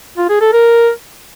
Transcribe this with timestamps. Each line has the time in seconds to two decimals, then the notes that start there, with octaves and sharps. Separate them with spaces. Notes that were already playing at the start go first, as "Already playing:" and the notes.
0.18 F4
0.29 G#4
0.41 A4
0.53 A#4